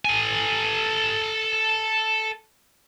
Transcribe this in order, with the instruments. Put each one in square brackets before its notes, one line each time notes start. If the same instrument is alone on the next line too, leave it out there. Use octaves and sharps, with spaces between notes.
[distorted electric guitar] A4 G#5